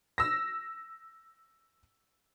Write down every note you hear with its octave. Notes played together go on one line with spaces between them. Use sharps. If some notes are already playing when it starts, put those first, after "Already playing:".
E6 A#6